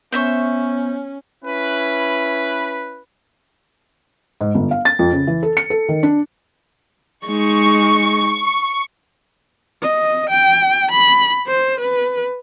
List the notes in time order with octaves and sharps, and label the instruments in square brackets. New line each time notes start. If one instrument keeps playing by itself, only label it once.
[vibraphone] B3 [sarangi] C#4 [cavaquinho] C5 E5 C#6
[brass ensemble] C#4 E4 B4
[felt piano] G#2
G1
F5
A6
F2
C#3
E3
A4
C#7
A4
D#3
D4
[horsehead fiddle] G#3 D#4 [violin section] C#6
[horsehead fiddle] D#5
G5
B5
C5
B4